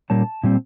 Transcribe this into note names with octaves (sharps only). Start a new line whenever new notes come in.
A#2 G3 A#3 C#4 A5
A#2 G3 C4